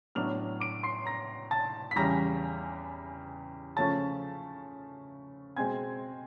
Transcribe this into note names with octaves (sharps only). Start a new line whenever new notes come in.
A2 F#3 B3 D4 F6 F7
D6 D7
C6 C7
A#5 A#6
A5 A6
B6
E2 C#3 E3 G3 A#5 A#6
C#3 F3 A3 C#4 A5 A6
B2 G#3 C4 G#5 G#6